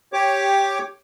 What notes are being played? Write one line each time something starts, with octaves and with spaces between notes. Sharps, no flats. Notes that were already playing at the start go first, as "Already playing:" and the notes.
G4 C#5 D6